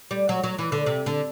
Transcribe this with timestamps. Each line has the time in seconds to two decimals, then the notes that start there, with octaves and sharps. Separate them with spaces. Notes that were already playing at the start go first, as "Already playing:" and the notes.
0.11 G3
0.29 F#3
0.44 F#3
0.59 E3
0.72 D3
0.86 C3
1.06 D3